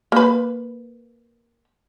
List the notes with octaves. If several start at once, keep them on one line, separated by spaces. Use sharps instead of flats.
A#3 B4